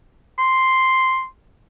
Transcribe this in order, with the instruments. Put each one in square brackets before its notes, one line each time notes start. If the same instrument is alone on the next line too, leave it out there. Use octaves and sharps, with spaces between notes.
[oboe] C6